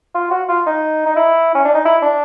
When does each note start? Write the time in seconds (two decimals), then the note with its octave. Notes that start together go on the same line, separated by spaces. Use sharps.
0.15 F4
0.31 F#4
0.48 F4
0.66 D#4
1.05 D#4
1.16 E4
1.54 C#4
1.65 D4
1.74 D#4
1.85 E4
2.02 D4